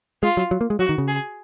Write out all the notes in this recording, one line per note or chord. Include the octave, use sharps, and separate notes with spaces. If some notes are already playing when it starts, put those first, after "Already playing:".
G#3 F4
F#3
F#3
A#3
G#3
F#3 F#4
D#3
C#3
G#4